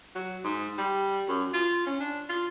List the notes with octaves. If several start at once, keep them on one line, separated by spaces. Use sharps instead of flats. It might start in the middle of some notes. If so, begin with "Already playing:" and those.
F#3
G#2
G3
F#2
F4
C#4
D4
F4